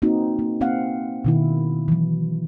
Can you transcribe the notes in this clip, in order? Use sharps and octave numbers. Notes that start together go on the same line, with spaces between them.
A#3 C4 D#4 F#4
A#3
A#3 C4 F5 F#5
B2 D#3 E4
E3 F#3